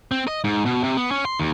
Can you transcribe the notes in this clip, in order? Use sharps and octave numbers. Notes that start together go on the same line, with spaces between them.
C4
D#5
G#2
B2
C3
B3
C#4
C6
D#2